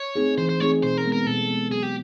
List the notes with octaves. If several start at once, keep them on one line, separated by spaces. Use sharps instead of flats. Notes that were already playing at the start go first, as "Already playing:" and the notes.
Already playing: C#5
A3 C4 D#4 G#4
E3 C5
C5
A3 C4 D#4 G#4 C#5
B2 C5
A#4
G#3 B3
A#4
B2 A4
G#3 B3
F#3 G#4
G4